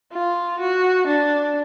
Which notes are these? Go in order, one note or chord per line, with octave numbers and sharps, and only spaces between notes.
F4
F#4
D4